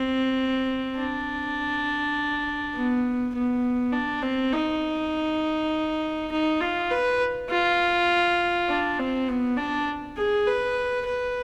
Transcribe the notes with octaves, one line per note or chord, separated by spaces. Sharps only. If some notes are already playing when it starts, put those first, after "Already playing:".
Already playing: C4
D4
B3
B3
D4
C4
D#4
D#4
F4
B4
F4
D4
C4
B3
D4
G#4
B4
B4